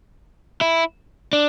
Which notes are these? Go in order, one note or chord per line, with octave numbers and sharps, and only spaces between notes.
E4
D4